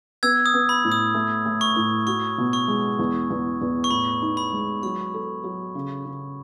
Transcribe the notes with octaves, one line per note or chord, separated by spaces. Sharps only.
B3 E6 G#6
D#6
B3
B5
A2
D#6
A3
A3
C#6
A2
F#4 C#6
B2
C#6
G#3
E2
E2
E2
C#6
A2 B5
D#4
B5
G#3
F#3 C#6
A4
F#3
C#3
C#3